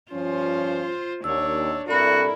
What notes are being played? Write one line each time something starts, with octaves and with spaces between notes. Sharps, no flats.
G2 F3 C#4 F4 C5
D#2 D4 C#5 E6
G2 C4 E4 F#4 A4 A#4 D5 B5